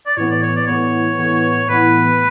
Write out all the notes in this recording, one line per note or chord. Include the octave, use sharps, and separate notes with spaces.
D5
A2 E3 B3 C#5
D5
C#5
D5
A2 E3 B3 C#5
A2 E3 B3
A2 E3 B3 B4